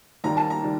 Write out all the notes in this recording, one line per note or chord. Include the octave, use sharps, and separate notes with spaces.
D#2 D#3 G3 A#3 A#5
A5
A#5
D#3 G3